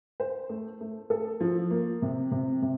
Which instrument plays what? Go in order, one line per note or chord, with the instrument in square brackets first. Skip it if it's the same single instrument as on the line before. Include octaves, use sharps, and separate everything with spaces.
[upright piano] C5
A3
A3
A4
F3
A#3
C3
C3
C3